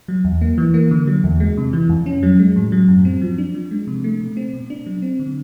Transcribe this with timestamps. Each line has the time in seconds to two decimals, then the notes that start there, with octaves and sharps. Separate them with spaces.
0.08 F#3
0.24 E2
0.41 A#3
0.58 E3
0.74 A#3
0.91 D3
1.07 F#3
1.24 E2
1.40 G#3
1.57 C3
1.73 E3
1.89 F2
2.06 C#4
2.23 F#3
2.39 G#3
2.56 A2
2.72 F#3
2.88 F#2
3.05 C4
3.21 F3
3.38 D4
3.55 F3
3.71 G#3
3.87 C3
4.04 A3
4.20 B2
4.37 C4
4.53 B2
4.70 D4
4.86 F#3
5.02 C4
5.19 D3